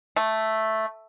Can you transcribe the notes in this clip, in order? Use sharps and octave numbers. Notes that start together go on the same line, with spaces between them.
A3